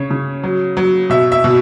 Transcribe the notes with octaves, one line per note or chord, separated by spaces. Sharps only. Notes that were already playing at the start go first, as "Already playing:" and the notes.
Already playing: C#3 C#5
C#3
F#3
F#3
B2 E5
E5
B2